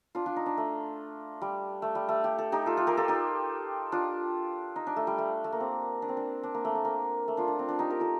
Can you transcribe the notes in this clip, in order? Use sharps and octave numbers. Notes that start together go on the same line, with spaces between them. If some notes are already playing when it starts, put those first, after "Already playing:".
D4 F4
D4 F4
D#4
D4
A3
G3
A3
G3
A3
G4
A4
D#4 G4
F4 A4
F4 A4
G4 A#4
F4 A4
D#4 G4
D4 F4
D#4
D4
A3
G3
A3
A3
A#3
C4
D4
C4
D4
D4
A#3
A3
A3
A#3
A3
D4 F4
D4
C4
D4
D#4 G4
G4 A#4
F4 A4